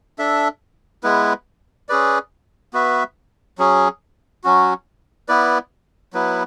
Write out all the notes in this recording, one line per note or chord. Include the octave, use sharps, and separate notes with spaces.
D4 A4 E5
G#3 B3 E4 B4
C#4 G#4 B4 D5
B3 F#4 B4 E5
F#3 C#4 G#4
F#3 C#4 F#4
B3 E4 B4 D5
F#3 B3 E4 B4